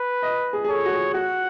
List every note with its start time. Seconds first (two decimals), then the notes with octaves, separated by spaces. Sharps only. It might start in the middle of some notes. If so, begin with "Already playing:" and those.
Already playing: B4
0.22 D#5
0.53 G#4
0.64 G#4
0.68 A4 C#5
0.85 F#4
0.92 G#4
1.14 F#4 F#5